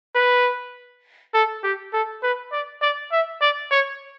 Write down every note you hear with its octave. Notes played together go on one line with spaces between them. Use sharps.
B4
A4
G4
A4
B4
D5
D5
E5
D5
C#5